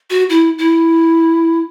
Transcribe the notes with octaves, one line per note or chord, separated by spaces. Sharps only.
F#4
E4
E4